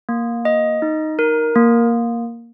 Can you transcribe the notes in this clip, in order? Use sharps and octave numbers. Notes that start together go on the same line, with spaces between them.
A#3
D#5
D#4
A#4
A#3